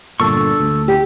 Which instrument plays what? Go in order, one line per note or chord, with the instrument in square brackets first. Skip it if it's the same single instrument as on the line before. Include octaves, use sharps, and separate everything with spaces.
[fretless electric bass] G1 A#2 [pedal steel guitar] D4 A4 C#6
[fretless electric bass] D2
[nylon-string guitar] G4